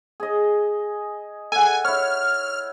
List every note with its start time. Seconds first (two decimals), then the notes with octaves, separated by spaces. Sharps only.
0.20 G#4 D#5
1.52 A4 F#5 G#5
1.85 E4 C#5 F6